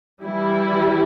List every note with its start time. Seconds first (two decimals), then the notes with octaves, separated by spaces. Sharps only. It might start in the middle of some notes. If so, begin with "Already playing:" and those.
0.25 E3 G3 E4